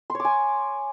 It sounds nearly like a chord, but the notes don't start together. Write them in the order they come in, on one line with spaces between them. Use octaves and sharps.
C6 C#5 D6 G#5